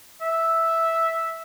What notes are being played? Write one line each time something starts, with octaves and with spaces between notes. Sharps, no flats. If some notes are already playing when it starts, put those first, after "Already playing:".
E5